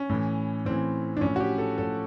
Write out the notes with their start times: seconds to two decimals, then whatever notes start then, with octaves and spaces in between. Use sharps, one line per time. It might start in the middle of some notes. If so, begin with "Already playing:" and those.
Already playing: C#4
0.10 A2 E3
0.65 A2 E3 C4
1.17 D4
1.21 A2 F3 C#4
1.36 F#4
1.40 G4
1.58 A4
1.77 A2 F3 A4